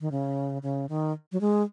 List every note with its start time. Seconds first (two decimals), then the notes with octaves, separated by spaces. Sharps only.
0.01 D#3
0.12 C#3
0.63 C#3
0.89 D#3
1.32 F#3
1.41 G#3